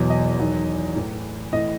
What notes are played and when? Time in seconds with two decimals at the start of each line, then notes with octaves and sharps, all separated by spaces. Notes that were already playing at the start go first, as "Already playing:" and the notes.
Already playing: E2 B2 F#3
0.10 D#5
0.39 E2 D#3 F#3
0.96 A2 E3
1.53 A2 E3 D#5